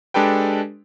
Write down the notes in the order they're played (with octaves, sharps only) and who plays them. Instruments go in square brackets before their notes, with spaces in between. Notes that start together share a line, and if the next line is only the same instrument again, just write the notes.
[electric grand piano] G#3 D4 G4 A4 B4 G5